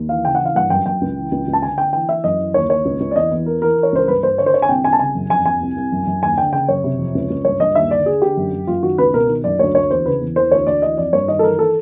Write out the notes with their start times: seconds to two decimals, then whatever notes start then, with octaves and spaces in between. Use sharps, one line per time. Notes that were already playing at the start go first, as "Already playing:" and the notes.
Already playing: D#2
0.09 E3 F5
0.25 C#3 G5
0.35 F#5
0.40 E3
0.45 F5
0.55 G2 F#5
0.70 F#2 G5
0.86 F#2 G5
1.01 C#2
1.17 E3
1.32 C#2
1.47 C#2
1.53 A5
1.62 D3 G#5
1.78 D3 G5
1.93 E3 G5
2.08 E3 E5
2.24 F#2 D#5
2.39 E3
2.54 D#2 C#5
2.70 D#2 C#5
2.85 C#2
3.00 C#2
3.11 D5
3.16 E2 D#5
3.31 E2
3.46 E3 A#4
3.61 E3 A#4
3.77 E3
3.83 C#5
3.92 C#2 C5
4.08 G2 B4
4.23 G2 C5
4.38 D3 C#5
4.46 C5
4.54 D3 C#5
4.62 G#5
4.69 C2 G5
4.84 C2 G#5
4.93 A5
4.99 C#3 G#5
5.15 F#2
5.30 F2 G#5
5.45 F2 G#5
5.61 C2
5.76 C2
5.92 F#2
6.07 F#2
6.23 D#2 G#5
6.38 D3 G5
6.53 C#3 G5
6.68 F#2 C#5
6.84 C3
6.99 F2
7.15 C#2
7.30 C#2
7.45 G2 C#5
7.60 G2 D#5
7.75 D#2 E5
7.91 D3 D5
8.06 D3 G#4
8.22 D3 G4
8.37 F#2
8.52 F#2
8.67 F#2 F4
8.83 D#3 F#4
8.98 C#2 B4
9.13 B2 A#4
9.29 D#3
9.44 F#2 D5
9.59 D2 C#5
9.75 D2 C#5
9.90 E2 C5
10.06 C#3 B4
10.21 E2
10.36 E3 C5
10.51 D2 C#5
10.67 D2 D5
10.82 E3 D#5
10.97 F2 D5
11.13 G2 C#5
11.28 D#3 D#5
11.39 A4
11.43 E3 A#4
11.59 A4